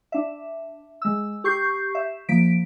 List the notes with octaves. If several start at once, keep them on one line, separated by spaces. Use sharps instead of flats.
D4 E5
G#3 E6
G4 C#6 G6 C7
E5
F3 A#3 B6 D7